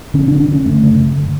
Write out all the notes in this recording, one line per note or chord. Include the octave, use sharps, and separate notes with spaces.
D3 C#4
D4
D3
D4
D3 C#4
F#2 A3
C#3
F#2
D3